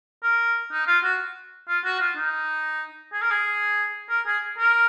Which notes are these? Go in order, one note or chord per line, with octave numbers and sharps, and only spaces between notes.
A#4
D#4
F4
F#4
F4
F#4
F4
D#4
G#4
A#4
G#4
A#4
G#4
A#4